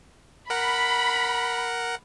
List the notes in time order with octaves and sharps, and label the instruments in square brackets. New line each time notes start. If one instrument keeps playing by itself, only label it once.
[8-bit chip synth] A#4 F#5 [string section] B5